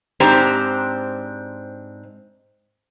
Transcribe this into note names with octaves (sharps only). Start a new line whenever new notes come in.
G#2 C4 D4 G4 C5 A#5